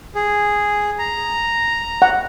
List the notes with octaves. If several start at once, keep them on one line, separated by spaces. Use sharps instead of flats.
G#4
A#5
F#5